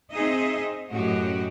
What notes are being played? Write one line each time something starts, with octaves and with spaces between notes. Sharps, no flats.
C4 D#4 G#4 D#5 E5
F#2 A2 F#4 G4 D#5